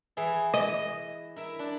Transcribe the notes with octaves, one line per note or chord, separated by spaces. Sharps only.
E3 E4 G#4
D#5
E4 A#4 E5
D4